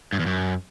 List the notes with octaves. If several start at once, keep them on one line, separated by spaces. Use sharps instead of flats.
G2
E2
F#2